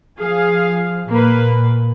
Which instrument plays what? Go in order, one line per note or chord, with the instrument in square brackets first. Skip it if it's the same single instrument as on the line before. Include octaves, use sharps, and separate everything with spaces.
[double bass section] F3 [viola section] G#4 F5
[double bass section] A#2 [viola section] A#3 B4